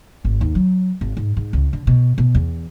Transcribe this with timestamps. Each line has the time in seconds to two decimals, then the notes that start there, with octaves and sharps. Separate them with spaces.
0.25 G#1
0.41 D#2
0.55 F#3
1.01 G#1
1.17 G#2
1.37 G#2
1.53 C#2
1.73 D3
1.87 B2
2.18 B2
2.34 E2